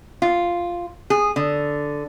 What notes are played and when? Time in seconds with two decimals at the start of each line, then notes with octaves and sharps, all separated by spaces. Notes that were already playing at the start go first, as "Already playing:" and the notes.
0.22 F4
1.10 G#4
1.36 D3